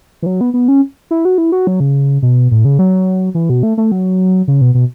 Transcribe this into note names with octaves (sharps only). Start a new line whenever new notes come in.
E3
F#3
B3
B3
C#4
E4
F#4
E4
F#4
F#3
C#3
B2
A2
C#3
F#3
E3
B2
A3
A3
F#3
C#3
B2
B2